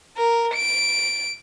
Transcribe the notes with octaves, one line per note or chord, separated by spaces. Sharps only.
A#4
D7